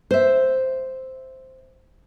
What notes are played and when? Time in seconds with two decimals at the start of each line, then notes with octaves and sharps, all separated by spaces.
0.11 C5 E5